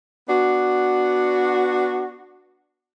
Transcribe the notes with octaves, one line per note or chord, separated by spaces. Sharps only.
B3 D4 F#4